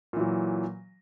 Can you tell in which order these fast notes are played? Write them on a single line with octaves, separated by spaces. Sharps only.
A#2 E3 F#3